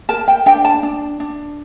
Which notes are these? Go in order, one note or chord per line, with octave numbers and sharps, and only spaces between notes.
A#4 A5
G5
D4 G5
A5
D4
D4